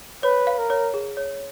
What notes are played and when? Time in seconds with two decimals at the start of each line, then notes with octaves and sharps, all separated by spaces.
0.23 B4 C#5
0.47 F5
0.58 A#4
0.70 C#5
0.94 G#4
1.17 C#5